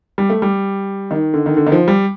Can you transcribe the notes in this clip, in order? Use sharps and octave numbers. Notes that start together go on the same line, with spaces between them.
G3
A3
G3
D#3
D3
D#3
D3
D#3
F3
G3